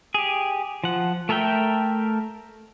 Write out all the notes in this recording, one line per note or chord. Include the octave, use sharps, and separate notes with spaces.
G4 G#4
F3 F#5
A3 A4 A#4 E5 G5